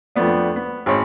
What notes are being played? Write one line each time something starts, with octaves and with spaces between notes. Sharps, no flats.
F2 F3 A3 B3 D4
B3
G#1 C5 C#5 B5